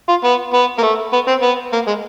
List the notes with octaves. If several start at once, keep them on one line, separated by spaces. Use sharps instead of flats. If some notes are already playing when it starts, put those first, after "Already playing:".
F4
B3
B3
A#3
A3
B3
C4
B3
A#3
G#3